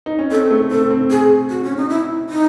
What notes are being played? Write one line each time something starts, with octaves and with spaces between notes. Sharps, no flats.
D#4
C#4
C4 A4
A3
C4 A4
C4
G#4
F#4
C#4
D#4
E4
D#4